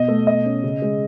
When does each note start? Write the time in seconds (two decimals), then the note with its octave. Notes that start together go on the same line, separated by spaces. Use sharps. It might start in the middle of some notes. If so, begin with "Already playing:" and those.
Already playing: B2 D#5
0.08 A3
0.27 B2 D#5
0.45 C#4
0.64 C#3
0.82 G#3